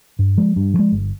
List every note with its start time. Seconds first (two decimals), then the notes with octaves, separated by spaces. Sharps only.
0.19 G2
0.37 F3 G#3
0.56 G2
0.74 F3
0.79 G#3
0.92 G1